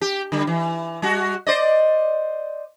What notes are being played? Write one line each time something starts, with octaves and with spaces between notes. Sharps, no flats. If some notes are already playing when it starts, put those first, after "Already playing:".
G4
D3 G3
E3
G3 F#4
C5 D5 D#5